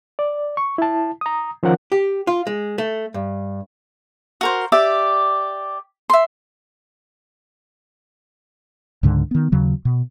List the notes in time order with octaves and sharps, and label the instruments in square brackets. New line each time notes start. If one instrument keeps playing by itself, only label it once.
[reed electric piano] D5
C#6
E4 A5
A#5 D#6
D#3 F3 C#4 A#4 F#5
[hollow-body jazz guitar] G4
F4
G#3
A3
G2
[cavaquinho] F#4 A#4 C5
G4 D5 E5 D6
E5 C6
[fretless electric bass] C#2 G#2 D3
D#3 B3
D#2 C#3 F#3
B2